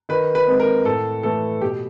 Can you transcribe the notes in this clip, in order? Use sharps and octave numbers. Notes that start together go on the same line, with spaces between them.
D#3 B4
B4
G#3 C4
B4
A#4
A2 A4
E3 A3 A4
B2 G4